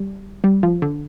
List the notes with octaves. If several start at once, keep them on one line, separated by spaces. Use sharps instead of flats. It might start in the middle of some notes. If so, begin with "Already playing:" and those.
Already playing: G3
G3
F3
D3